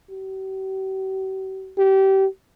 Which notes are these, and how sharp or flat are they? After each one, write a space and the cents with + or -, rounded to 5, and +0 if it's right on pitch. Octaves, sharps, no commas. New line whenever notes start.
G4 -45
G4 -25